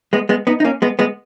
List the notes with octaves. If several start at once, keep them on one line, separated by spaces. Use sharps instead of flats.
G#3 B3
G#3 B3
B3 D#4
D#4
A#3 C#4
G#3 B3
G#3 B3